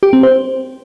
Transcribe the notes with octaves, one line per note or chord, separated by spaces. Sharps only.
G4
C4
C5